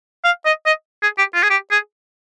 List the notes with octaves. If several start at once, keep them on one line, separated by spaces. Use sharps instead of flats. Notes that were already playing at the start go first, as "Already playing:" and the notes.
F5
D#5
D#5
G#4
G4
F4
G#4
G4
G#4